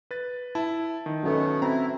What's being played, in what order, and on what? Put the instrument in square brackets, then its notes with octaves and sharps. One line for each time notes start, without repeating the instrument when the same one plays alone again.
[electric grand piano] B4 A6
[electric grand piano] E4 [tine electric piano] A5
[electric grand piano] D#3
[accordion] B2 A3 B3 [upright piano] F#3 C#4 A4
[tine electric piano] C4 [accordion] E4 [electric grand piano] A#5